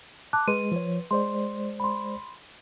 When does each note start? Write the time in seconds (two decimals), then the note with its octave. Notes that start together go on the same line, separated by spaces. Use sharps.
0.33 A5 D6 F#6
0.48 G#3 B4 C6 D#7
0.72 F3 C#5
1.11 G#3 C5 D5 C6
1.80 B5 C6